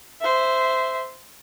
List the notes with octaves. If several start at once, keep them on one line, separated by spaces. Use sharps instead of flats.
C5 E5